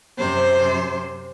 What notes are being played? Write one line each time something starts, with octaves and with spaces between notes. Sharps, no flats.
F#2 C3 C5